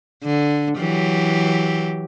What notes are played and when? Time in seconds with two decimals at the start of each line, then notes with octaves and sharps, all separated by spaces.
0.24 D3
0.78 E3 F#3 G4